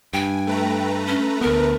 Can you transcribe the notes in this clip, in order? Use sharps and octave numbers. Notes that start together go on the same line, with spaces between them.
G2 G5 G#5
A3 B4 A#5
C#4
D2 B3 A#4